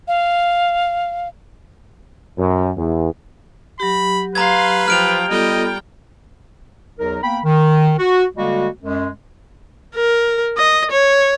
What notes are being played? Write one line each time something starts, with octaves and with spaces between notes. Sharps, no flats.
F5
F#2
E2
F#3 G4 B5
B4 F5 A#5 C6 G#6
F3 G5 F6 D7 F7
G3 B3 F4 A4 D#5 G5
E2 F#3 D#4 A#4
A#3 B3 G5 B5
D#3
F#4
D3 G3 G#3 A#3 F#4
F#2 G#3
A#4
D#5
C#5